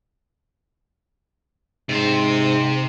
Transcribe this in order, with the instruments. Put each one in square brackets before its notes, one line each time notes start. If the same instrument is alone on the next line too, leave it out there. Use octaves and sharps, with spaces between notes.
[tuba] G#2 [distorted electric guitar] C3 C5